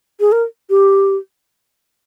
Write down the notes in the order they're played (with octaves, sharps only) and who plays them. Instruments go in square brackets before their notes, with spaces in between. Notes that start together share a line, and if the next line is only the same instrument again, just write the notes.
[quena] G#4
A#4
G4